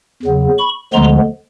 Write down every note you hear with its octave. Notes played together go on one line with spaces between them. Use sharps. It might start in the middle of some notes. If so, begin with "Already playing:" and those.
E2 C#3 F#3 B3
B5 C#6
D2 D3 F3 G#3 B3 A#5 C6